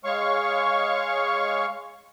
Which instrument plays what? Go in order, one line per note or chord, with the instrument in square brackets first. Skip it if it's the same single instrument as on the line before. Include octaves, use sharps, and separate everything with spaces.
[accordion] G#3 C#5 F5 C#6